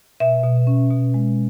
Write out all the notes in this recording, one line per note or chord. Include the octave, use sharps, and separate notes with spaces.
B2 E5
B2
C#4
B2
G#3